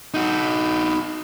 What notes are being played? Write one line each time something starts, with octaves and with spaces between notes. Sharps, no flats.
D#4 F#4